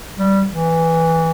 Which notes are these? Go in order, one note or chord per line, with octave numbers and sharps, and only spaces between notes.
G3
E3